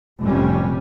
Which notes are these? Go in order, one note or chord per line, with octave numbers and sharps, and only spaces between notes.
F1 A2 C3 G3 C#4